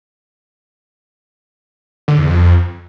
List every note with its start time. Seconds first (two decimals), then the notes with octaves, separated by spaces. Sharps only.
2.08 D3
2.19 E2
2.29 F2